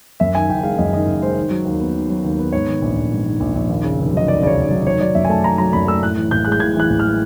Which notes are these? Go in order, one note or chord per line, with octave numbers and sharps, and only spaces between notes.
F#2 E5
D#3 G#5
F#1 G5
G#3 F5
F#2 D#5
D#3 D#5
F#1
G#3 C5
D#3
F#3
D#2
B3
D#3
F#3
D#2
B3
G#2 C#5
D#3
A#1
A#1
G#2
D#3
A#1
A#1
D#2
C#3
F1
F#3 D#5
D#2 D5
C#3 C#5 D5
F1
F#3
D#3 C#5
F#3 D5
F#2 E5
G#5
A3 A5
D#3 A#5
F#3 A#5
F#2 B5
A3 E6
A2 F#6
E3
A1 G6
G#3 F#6
G6
A2 G#6
E3 F#6
A1
G#3 F6